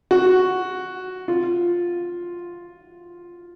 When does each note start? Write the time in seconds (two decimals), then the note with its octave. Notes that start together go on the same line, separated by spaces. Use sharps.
0.11 F#4
1.28 F4